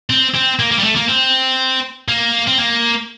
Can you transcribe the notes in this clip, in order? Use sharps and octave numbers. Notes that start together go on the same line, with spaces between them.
C4
C4
A#3
A#3
G3
A3
A#3
C4
A#3
C4
A#3